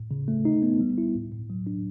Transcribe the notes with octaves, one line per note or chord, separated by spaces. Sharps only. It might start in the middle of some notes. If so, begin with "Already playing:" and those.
Already playing: A2
C#3
A3
D#4
B3
G3
E4
A2
A2
F#3
D4